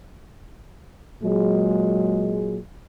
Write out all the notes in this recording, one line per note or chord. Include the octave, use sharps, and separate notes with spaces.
A#2 F#3 G#3